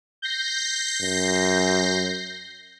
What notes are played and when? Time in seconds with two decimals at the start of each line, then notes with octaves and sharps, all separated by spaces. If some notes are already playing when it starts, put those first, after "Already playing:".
0.22 G6 A#6 C7
1.01 F#2